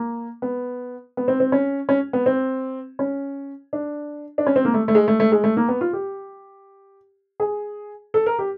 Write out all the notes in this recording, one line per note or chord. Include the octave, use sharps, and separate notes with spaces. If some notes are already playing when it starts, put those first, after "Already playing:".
Already playing: A#3
B3
B3
C4
C4
C#4
C#4
B3
C4
C#4
D4
D4
C#4
C4
A#3
A3
A3
G#3
A3
A3
G#3
A3
A#3
B3
F4
G4
G#4
A4
A#4
G4